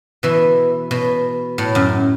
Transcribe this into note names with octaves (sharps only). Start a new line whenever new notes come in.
B2 E3
B2
A2
F#2